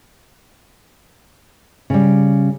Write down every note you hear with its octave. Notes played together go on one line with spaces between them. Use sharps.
C#3 G3